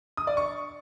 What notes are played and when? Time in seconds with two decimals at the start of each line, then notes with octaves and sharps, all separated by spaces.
0.17 D#6
0.27 D5
0.37 C#6